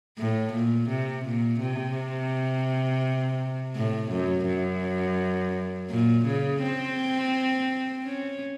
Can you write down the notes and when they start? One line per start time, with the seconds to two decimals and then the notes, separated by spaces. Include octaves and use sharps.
0.18 A2
0.53 A#2
0.89 C3
1.25 A#2
1.60 C3
3.76 A2
4.11 F#2
4.47 F#2
5.90 A#2
6.26 C#3
6.62 C4
8.05 C#4